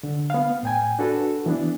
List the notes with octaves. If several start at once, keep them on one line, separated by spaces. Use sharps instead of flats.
D3
B3 F5
A2 G5 G#5
D4 F#4 A4 B4
E3 B3 D4